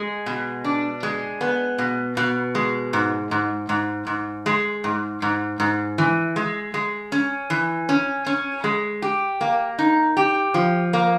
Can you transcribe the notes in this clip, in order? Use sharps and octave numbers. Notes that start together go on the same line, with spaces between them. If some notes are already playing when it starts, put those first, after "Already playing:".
Already playing: G#3
B2
D4
G#3
B3
B2
B2
G#3
G#2
G#2
G#2
G#2
G#3
G#2
G#2
G#2
E3
G#3
G#3
C#4
E3
C#4
C#4
G#3
G4
A#3
D#4
G4
F3
A#3